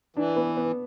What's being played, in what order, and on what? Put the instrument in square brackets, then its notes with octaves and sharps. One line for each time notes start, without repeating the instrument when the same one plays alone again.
[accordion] E3 [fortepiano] D4
[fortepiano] B3
B3